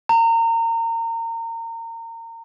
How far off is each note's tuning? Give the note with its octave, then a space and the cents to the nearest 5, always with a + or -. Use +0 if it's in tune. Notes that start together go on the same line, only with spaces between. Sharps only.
A#5 -30